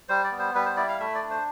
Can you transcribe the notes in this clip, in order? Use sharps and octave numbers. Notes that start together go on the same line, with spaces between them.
G3 C5
D5
B3
C5
G3 B4
C5
E4 D5
F5
A3 E5
D5
D4
C5